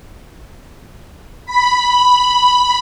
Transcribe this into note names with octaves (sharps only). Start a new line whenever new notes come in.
B5